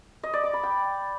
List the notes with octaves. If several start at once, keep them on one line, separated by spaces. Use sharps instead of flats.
D#5
D5
D6
B5
G5